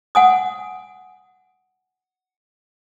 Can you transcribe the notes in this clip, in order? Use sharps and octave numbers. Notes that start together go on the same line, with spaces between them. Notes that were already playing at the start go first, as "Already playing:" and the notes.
F#5 G#5 D#6